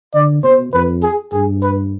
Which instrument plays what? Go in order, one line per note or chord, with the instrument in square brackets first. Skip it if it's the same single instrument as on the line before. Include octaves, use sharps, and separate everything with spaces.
[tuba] D3 [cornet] D5
[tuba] B2 [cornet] C5
[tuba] F2 [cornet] B4
[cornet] G#4
[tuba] G2 [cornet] G#4
[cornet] B4